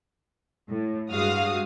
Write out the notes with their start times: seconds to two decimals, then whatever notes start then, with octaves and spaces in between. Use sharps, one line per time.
0.69 A2
1.11 G2 G#3 F#4 F5 D#6